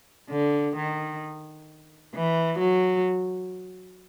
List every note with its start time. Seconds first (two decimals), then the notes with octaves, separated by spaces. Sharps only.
0.30 D3
0.76 D#3
2.14 E3
2.59 F#3